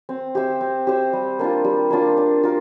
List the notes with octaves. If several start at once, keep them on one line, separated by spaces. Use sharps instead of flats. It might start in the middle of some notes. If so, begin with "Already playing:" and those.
C4
G4 C5 E5
C4
G4 C5 E5
G3
A#3 D4 F4
G3
A#3 D4 F4
D4
F4 A#4